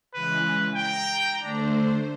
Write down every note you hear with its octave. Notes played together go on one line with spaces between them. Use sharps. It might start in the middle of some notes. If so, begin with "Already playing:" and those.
C#3 E3 G#3 B4
G5 A#5
D3 A3 D4 C5